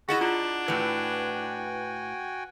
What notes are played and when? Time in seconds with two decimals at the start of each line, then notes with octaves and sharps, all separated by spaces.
0.09 E4 F#4 G#4 D#5 F#5 A6 E7
0.21 D4 F4
0.68 A2 E3 F#4 B4 G5 G#5